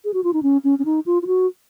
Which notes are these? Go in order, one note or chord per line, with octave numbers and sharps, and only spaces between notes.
G#4
F#4
F4
D#4
C#4
C#4
C#4
D#4
F4
F4
F#4